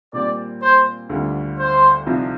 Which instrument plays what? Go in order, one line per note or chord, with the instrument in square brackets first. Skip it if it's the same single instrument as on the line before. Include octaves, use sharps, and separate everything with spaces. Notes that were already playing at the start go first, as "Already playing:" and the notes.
[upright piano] A#2 G3 C4 [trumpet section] D5
[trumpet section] C5
[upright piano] D2 D3 G3 C4 F4
[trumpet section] C5
[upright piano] C2 C3 F3 C4 D#4